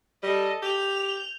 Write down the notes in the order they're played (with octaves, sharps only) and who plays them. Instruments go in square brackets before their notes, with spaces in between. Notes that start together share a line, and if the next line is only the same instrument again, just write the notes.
[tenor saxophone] G3 [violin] A4 D#5
[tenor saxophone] G4 [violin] G6 F7